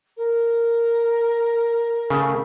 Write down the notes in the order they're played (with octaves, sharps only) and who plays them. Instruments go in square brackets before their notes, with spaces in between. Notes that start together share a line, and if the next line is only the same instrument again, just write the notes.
[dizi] A#4
[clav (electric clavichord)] C#3 A3